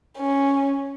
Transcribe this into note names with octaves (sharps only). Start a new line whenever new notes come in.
C#4